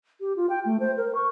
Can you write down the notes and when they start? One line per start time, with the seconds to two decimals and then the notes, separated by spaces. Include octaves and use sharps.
0.21 G4
0.36 F4
0.49 G5
0.65 A3
0.80 C5
0.97 A#4
1.15 C#6